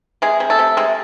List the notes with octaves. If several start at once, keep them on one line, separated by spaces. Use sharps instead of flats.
C3 G#3 G#4
C3
A3 A4
C3
C3 G#3 G#4